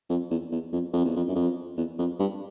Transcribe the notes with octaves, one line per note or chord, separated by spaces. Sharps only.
F2
E2
E2
F2
F2
E2
F2
F#2
F2
E2
F2
G2